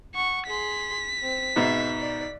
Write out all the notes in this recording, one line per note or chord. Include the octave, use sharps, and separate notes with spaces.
F#5 C#6
G#4 C6 B6
C4
G#2 B2 E5
D5